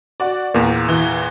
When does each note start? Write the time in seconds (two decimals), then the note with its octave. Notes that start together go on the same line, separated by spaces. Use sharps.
0.20 F#4 D5
0.54 E2 A#2 A#3
0.88 E3